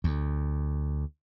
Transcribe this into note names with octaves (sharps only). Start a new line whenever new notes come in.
D2